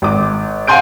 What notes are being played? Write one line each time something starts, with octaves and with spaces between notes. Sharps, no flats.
G#1 D6
F5 F#5 G#5 C6 G6 D7